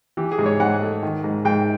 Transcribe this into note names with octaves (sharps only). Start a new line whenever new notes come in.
E3 G4
G#4
G#2
C#5
G#2 F#5
A3
D#3
G#2
G#2 G5